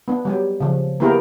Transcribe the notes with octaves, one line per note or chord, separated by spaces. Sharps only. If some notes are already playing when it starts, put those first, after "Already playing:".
B3 D4
F#3 G3 G4
C#3 F3
A#3 B3 E4 G4 G#4 A#4